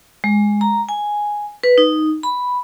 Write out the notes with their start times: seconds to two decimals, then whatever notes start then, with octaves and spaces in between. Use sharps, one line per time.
0.24 G#3
0.61 A#5
0.89 G#5
1.64 B4
1.78 D#4
2.23 B5